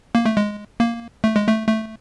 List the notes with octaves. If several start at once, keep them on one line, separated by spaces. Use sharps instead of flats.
A#3
A3
G#3
A#3
A3
G#3
A3
A3